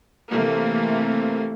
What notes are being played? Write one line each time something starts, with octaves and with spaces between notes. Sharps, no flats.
C3 E3 A3 A#3